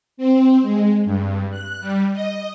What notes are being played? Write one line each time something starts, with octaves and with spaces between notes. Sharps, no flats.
C4
G#3
G2
F#6
G3
D#5